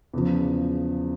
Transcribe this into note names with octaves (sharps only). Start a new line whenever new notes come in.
E2 C#3 F3